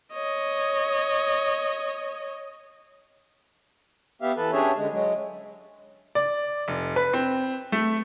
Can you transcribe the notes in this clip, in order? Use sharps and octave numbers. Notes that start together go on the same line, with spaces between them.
C#5 D#5
B3 G4 E5 F5
E3 A4 B4
C#4 D4 G4 G#4 C#5 E5
D3 G#3
F#3 G#3
D5
F1
B4
C4
A3